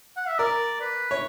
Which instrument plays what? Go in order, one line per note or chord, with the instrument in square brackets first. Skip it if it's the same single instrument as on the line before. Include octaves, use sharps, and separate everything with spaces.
[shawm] F#5
E5
[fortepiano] A#4 [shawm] D5
[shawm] B4
[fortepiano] C#5